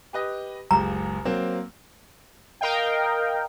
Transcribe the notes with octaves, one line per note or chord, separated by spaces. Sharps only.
G4 B4 D#5
F#1 C#2 G4 A#5
F#3 A#3 C4
A#4 D#5 F5 G5